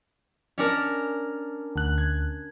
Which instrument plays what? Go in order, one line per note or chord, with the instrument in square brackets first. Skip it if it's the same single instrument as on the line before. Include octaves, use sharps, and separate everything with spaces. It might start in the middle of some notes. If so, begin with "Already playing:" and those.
[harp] C#4 D4 A#4
[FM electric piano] D2 F#6
[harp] G#6